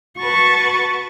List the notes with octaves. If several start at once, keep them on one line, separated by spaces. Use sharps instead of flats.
F#4 B4 A5 C#6